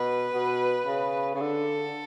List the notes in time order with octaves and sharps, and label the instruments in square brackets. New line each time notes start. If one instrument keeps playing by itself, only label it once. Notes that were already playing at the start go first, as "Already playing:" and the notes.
Already playing: [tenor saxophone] B2 [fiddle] B4
[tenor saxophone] B2
C#3
C#3
[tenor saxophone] D3 [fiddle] A4